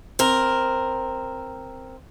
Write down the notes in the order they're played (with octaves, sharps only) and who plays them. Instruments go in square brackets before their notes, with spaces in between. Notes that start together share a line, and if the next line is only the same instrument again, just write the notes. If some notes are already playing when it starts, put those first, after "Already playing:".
[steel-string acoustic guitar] C4 A#4